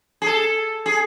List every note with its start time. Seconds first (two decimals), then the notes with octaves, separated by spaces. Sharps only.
0.22 G#4
0.26 A4
0.86 G#4